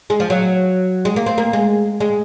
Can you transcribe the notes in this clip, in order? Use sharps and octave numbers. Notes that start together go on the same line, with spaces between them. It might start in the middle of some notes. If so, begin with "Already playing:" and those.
G#3
F3
F#3
G#3
A#3
C4
A#3
G#3
G#3